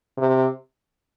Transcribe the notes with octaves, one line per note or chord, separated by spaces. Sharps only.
C3